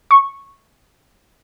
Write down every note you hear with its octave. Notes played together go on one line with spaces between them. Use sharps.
C#6